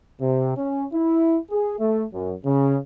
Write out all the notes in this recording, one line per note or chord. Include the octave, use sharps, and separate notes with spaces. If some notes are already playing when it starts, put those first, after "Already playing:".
C3
C#4
E4
G#4
A3
F#2
C#3